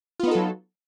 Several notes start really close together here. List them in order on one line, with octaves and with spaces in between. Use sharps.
F4 B3 D#4 A4 F#3